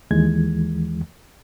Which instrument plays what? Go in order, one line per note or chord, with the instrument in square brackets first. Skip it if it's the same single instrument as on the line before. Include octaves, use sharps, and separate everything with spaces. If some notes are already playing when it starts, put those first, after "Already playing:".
[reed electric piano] D#2 E3 G#3 G#6